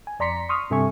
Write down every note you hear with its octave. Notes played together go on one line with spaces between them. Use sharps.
G#5
F2 D5 A#5 C6 B6 C#7
C6 C#6 D#6 F6
G2 C3 A4 E5 G#5 C#6